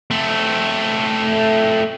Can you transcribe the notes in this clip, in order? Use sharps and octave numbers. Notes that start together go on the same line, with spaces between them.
A3 C4